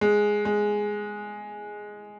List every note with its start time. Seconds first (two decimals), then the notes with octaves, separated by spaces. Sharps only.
0.01 G#3
0.45 G#3